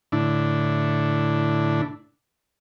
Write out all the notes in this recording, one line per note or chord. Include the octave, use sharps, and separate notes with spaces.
A2 D3 D4 E4